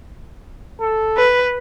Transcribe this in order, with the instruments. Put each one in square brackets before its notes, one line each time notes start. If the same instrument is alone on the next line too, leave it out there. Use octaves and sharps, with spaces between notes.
[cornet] A4
[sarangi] B4